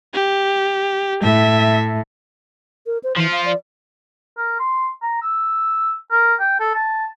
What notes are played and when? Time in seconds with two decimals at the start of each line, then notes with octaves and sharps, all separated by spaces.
0.14 G4
1.23 A2 E5
2.86 A#4
3.03 C5
3.16 E3 F3 F4
3.32 F5
3.45 D5
4.37 A#4
4.60 C6
5.02 A#5
5.22 E6
6.11 A#4
6.40 G5
6.60 A4
6.75 A5